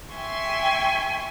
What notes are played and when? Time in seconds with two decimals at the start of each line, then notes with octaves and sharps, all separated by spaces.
0.15 E5 G5 G#5 C6 C#6